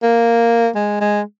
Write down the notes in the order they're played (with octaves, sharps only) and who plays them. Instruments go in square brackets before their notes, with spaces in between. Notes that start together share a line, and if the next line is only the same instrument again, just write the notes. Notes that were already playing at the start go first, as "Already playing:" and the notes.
[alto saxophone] A#3
G#3
G#3